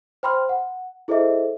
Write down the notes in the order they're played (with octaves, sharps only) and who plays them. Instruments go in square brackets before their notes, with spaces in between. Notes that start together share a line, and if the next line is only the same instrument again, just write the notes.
[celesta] C5 G5 B5 C6 F6
F#5
E4 G#4 A4 C5 D#5 E5